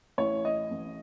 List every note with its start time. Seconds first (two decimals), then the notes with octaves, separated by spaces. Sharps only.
0.18 A1 A2 E3 C#5
0.45 D#5
0.71 A1 A2 E3